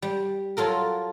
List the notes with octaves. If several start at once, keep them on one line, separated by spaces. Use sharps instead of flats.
G3
F#3 F4 A4 A#4